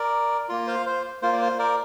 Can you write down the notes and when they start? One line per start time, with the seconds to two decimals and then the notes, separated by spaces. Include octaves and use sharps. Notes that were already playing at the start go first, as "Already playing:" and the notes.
Already playing: A#4 D5
0.49 A#3 F4
0.67 C5 F5
0.86 C5
1.22 A#3 F4 C5
1.33 D5
1.41 C5
1.59 A#4 D5